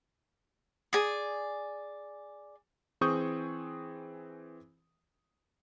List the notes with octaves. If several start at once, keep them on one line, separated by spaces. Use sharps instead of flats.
G#4 D5 D#6
E3 C4 G#4 C#6 D#6 G6